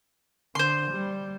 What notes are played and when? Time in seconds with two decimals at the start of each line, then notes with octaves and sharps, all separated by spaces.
0.55 D3 C5 C6
0.91 G3